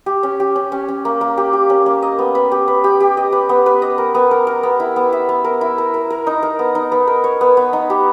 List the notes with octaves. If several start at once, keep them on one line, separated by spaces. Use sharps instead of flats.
G4
C#4
G4
C#4
C#4
C#4
A#3
A#3
G4
G4
C#4
A#3
D#5
B3
B4
G4
B4
G4
G4
D#5
B4
B3
B4
D#5
A#4
B3
A#4
A#4
B3
E4
B3
E5
B3
A#4
E4
A#4
A#4
A#4
D#4
A#4
B3
D#4
B3
A#4
C#5
B3
B3
D#4
G4